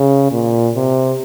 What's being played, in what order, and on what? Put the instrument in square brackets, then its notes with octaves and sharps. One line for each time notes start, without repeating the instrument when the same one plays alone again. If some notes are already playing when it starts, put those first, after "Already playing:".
Already playing: [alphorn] C#3
A#2
C3